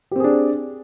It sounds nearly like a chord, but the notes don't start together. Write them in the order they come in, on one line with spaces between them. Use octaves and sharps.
G4 C4 G#4 D4